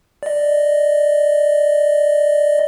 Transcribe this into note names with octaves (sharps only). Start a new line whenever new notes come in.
D5 D#5